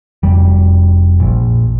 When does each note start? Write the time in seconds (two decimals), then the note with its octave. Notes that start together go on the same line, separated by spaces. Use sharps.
0.23 F1 G3
1.20 A#1